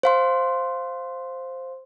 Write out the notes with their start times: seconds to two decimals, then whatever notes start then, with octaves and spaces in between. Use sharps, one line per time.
0.03 C5 F5 C6